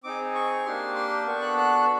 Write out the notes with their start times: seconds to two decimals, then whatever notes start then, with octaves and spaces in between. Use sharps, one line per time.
0.04 C4 D#4 G#4 D6
0.35 C#6
0.65 A#3 D4 G4 C6
0.96 C6
1.26 B3 D4 F#4 A4 C#6
1.42 F#6
1.58 F#6